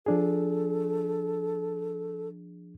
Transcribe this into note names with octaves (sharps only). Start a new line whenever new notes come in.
F3 D4 G#4 A4